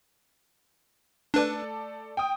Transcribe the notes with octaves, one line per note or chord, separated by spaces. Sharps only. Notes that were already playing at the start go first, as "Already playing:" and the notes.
A3 D4 A4 B4 D5
G5 D#6